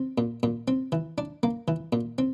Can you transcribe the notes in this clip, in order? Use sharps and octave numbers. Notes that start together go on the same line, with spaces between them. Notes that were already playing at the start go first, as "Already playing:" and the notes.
Already playing: C4
A#2
A#2
C4
E3
D4
A#3
E3
A#2
C4